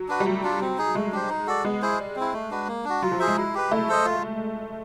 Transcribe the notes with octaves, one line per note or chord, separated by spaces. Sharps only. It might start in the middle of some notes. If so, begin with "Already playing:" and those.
Already playing: F#3
D4 F#4 B4
G3
F#3 A3
D4 F4
C4
D#4 G#4
G#3 A3
D4 G4 C5
D#4
F#4 A4 D5
G#3 B3
E4 G#4 C5
G3
C4 E4
A3
D4 F#4 B4
A#3
D4 F#4
F#3 F4
F3
G#4 C5 E5
G#3
E4
G4 B4
A3 E4
A4 C5 D#5
F4